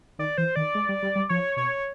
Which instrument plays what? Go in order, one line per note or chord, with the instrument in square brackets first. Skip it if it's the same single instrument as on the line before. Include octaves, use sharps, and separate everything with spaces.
[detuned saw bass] D#3 [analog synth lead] D5
[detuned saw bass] E3 [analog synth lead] C5
[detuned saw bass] D#3 [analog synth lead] D5
[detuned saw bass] G#3
G3
G3
G3
[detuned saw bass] F3 [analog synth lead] C#5
[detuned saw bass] B2 [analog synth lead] C#5